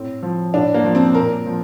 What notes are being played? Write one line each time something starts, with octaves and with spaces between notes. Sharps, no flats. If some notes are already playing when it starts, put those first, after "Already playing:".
Already playing: A2 C4
F3
A2 D4
A#3
F3
C4
A#2 A#4
F3